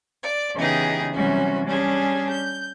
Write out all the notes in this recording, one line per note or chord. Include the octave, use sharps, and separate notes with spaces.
D5
C#3 E3 B3 D#4 G4 G#4
C3 E3 F#3 G3 C#4 F#4
G3 C#4 D4 G#4
G6